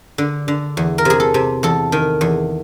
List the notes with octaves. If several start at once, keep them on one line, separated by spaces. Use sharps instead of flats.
D3
D3
E2
A#4
C3 G#4
A4
C3
E2 A4
D#3
E2